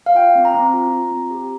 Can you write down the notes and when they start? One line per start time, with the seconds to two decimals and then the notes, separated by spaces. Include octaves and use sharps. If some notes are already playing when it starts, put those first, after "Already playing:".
0.06 F5
0.15 F4 G5
0.35 C4
0.45 A#5
0.54 C4
0.74 F4
0.93 F4
1.11 C4
1.31 G4